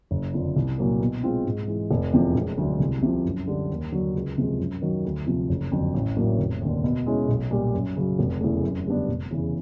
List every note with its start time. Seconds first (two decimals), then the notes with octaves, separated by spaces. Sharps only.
0.11 F#1
0.33 F2 D3 F3
0.56 C2
0.78 A#2 F#3 A#3
1.00 B2
1.23 G#3 C4 F4
1.45 G#2
1.68 E3 G#3
1.91 F1
2.13 E2 C3 F3
2.35 E1
2.58 D2 D3 F#3 A3
2.80 C2
3.03 C3 F3
3.25 F#2
3.47 D3 G3
3.70 D#2
3.92 D3 F#3
4.14 C#2
4.38 C3 F3 G#3
4.59 F#2
4.82 D#3 F#3
5.05 D2
5.27 C3 F3
5.49 F#1
5.72 F2 D3 F#3
5.94 A1
6.17 A2 F#3 A#3 D4
6.39 F1
6.61 D#2 D3
6.84 B2
7.06 G#3 C#4 E4
7.29 B1
7.51 A#2 G3
7.74 F#2
7.96 C#3 F#3
8.19 F1
8.41 E2 C#3 E3 A3
8.63 F#2
8.86 D3 G3 B3 D4
9.08 F1
9.31 E2 C#3 E3